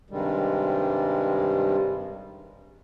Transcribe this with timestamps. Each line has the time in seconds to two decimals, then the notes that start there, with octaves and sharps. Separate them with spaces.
0.10 G2 C3 D#3 G3 G#3